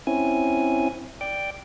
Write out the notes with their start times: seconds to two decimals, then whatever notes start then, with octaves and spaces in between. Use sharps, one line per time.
0.07 C4 C#4 E4 G#5
1.21 D5 G5